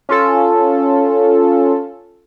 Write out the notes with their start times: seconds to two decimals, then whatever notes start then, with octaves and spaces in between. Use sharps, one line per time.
0.09 C#4 F4 A4